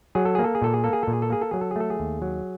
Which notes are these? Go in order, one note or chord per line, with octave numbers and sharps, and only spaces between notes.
F#3 G#4
A4
A#3 G#4
A4
G#4
A#2 A4
G#4
A#3 A4
G#4
A#2 A4
G#4
A4
A#3 G#4
A4
F#3 G#4
A4
G#4
A3 A4
G#4
D#2
F#3